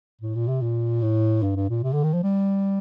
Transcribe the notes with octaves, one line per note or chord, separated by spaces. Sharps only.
A2
A#2
C3
A#2
A2
G2
G2
A#2
C3
D3
D#3
F3
G3